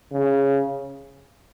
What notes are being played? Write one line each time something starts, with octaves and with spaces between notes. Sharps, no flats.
C#3